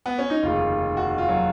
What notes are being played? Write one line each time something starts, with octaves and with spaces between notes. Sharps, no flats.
B3
C#4
D#4
F1 D#2 C#3 F4
F#4
F4
F#3